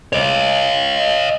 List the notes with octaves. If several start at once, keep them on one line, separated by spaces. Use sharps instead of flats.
C#5 D#5